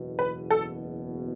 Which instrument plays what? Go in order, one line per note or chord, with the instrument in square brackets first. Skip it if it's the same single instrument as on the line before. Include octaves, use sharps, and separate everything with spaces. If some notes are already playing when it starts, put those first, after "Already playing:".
Already playing: [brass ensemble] F#1 E2 B2
[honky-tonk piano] B4
A4